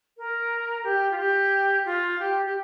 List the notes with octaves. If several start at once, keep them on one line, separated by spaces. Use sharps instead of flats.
A#4
G4
F4
G4
F4
G4
G4